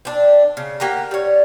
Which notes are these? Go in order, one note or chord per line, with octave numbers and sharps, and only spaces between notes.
C4 D4
C#3
A#3 G4 F#5 A#5
G3 C#5